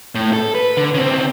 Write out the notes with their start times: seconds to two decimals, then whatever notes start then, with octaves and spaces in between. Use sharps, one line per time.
0.15 A2
0.33 A4
0.55 B4
0.77 D3
0.94 C#3 C4